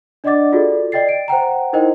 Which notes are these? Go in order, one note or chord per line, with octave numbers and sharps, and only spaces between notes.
D4 D5 D#5 F#5 D6 A6
F4 F#4 G#4 A4 D5
D5 D#5 G5 A6 C7
D7
C5 F#5 G5 A#5
D#4 E4 A#4 C5 D#5 G5